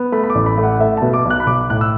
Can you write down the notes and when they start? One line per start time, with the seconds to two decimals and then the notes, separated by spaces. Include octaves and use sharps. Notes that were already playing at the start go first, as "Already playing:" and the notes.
Already playing: B3
0.12 A3 B5
0.24 B5
0.30 D6
0.35 A1
0.46 B5
0.58 A3
0.63 F#5
0.80 A3 E5
0.97 B2 A5
1.14 D6
1.25 B1
1.30 F#6
1.40 B5
1.47 B1 D6
1.70 A2 F#6
1.81 E6